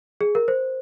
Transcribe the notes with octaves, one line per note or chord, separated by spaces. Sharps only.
G#4
A#4
C5